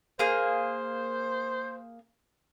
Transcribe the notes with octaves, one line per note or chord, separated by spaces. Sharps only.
A#3 G#4 C5